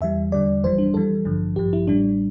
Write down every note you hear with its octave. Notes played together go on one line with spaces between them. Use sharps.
E2 E3 G3 E5
E2 D3 G3 D5
G1 F2 E3 G3 C5
D4
F2 E3 G3 A4
A1 G2 D3 F3
A1 G2 F3 G4
E4
A1 A2 G3 D4